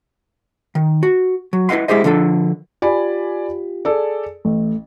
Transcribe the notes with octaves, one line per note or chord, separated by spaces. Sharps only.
D#3
F#4
F#3
E4 B4 D#5 F#5 C6
G#3 E4 G4 G#4 C5 D#5
D3 F3 D4 A4
F4 G4 D5 G#5 B5
G#4 A4 D5
A1 A3